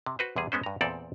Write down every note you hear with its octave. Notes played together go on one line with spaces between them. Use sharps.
C3
F#4 B4 C5
E2 C3 G3 G#4
G#3 B3 C#4 C5
G2 A#5
E2 A#2 C4 A4 D5